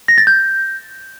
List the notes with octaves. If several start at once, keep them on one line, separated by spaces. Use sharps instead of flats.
A#6
A6
G6